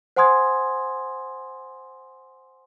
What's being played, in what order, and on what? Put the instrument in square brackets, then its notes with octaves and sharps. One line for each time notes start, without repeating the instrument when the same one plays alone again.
[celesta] C5 F#5 G#5 C6 D#6 G#6